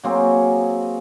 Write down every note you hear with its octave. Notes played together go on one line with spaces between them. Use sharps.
F#3 A#3 C4 G#4